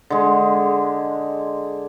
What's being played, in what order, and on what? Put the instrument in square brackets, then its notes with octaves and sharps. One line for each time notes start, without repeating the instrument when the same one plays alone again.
[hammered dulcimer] D3 G#3